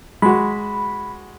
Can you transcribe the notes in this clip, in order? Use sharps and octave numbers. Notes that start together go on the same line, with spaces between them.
G#3 F#4 B5